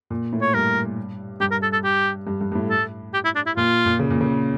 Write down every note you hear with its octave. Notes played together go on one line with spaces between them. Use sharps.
A#2
A2
C#5
G2 A#4
G2 G4
A#4
A4
A4
G4
G2
G2
G2
A2
A4
G4
E4
D4
E4
A#2 F4
A#2
C#3
A#2
C#3